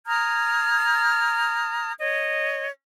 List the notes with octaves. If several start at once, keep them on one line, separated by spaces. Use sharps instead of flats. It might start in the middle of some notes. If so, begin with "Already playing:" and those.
A#5 D#6 F6 G#6
C#5 D#5